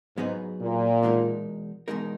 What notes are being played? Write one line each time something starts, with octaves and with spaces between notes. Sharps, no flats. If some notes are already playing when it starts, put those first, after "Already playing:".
G#2 F#3 B3 D#4 G#4 B4
A#2
E2 B2 G#3 D#4 A#4
E2 B2 G#3 D#4 A#4